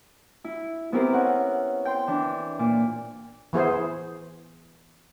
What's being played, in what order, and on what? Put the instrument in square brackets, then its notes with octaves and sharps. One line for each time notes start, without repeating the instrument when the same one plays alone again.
[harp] E4
B3 C4 E4 G4 A#4 C5
C#4 F#5
G5 C6
E3 D4
A#2
[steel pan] E3 B3 G#4 C5